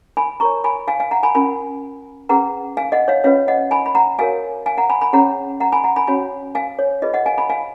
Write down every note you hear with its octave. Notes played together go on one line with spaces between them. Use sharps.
G#5 B5
F4 A#4 C#5 A#5 C#6
G#5 B5
F5 G#5
F5 G#5
F#5 A#5
G#5 B5
C#4 F4 A#4 G#5 B5
C#4 G#4 B4 F#5 A#5
F5 G#5
D#5 F#5
C#5 F5
C#4 F4 B4 C#5 F5
D#5 F#5
G#5 B5
B5
F#5 A#5
F#4 A#4 C#5 F5 G#5
F5 G#5
F#5 A#5
G#5 B5
G#5 B5
C#4 G#4 C#5 F#5 A#5
F#5 A#5
G#5 B5
F#5 A#5
G#5 B5
C#4 F#4 C#5 G#5 B5
F5 G#5
C#5
F4 G#4 B4 D#5
D#5 F#5
F5 G#5
G#5 B5
F5 G#5